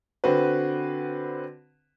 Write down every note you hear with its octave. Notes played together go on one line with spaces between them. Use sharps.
D3 C4 F#4 B4